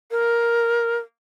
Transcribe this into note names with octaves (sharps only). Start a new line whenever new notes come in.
A#4